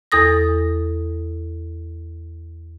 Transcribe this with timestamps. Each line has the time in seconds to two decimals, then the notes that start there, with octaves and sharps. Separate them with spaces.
0.12 E2 A4 D#6 A#6